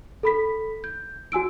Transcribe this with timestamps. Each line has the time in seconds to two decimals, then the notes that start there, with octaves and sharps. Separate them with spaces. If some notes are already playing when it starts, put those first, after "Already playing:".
0.23 A4 B5 B6
0.84 G6
1.32 F#4 G#5 E6 D7